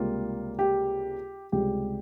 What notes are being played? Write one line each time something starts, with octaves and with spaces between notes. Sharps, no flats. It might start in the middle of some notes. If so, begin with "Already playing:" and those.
Already playing: C#2 C3 G3 A#3 F4
G4
C#2 C3 G3 G4